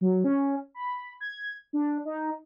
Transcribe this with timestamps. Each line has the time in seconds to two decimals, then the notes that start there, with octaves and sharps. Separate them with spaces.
0.01 F#3
0.24 C#4
0.75 B5
1.20 G#6
1.73 D4
2.05 D#4